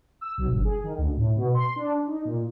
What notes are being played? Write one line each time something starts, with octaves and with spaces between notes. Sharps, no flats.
E6
B1
G1
G#4
D#3
D2
A2
B2
C6
D4
D#4
A#2